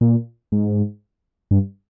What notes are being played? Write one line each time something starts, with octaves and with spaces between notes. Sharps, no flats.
A#2
G#2
G2